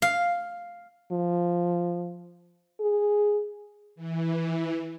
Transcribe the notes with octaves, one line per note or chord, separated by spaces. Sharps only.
F5
F3
G#4
E3